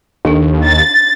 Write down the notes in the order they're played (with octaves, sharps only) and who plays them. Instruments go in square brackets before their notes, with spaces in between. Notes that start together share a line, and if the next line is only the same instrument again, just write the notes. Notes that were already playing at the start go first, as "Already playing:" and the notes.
[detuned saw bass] D#2 [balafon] D4 D#4 A4
[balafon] A#5 [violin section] A6